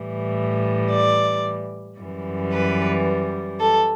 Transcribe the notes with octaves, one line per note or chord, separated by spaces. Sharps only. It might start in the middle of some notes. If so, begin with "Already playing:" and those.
Already playing: A2 E3 G3
D5
F#2 E3 G3
B4
A4